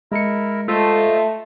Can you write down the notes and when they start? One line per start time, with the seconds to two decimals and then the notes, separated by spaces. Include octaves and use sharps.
0.12 G#3 E4 A#4 C#7
0.68 A3 F4 C5 D#5 E5